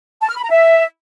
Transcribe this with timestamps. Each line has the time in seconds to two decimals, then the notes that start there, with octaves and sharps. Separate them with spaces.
0.23 A5
0.30 F6
0.37 B5
0.44 A#5
0.51 E5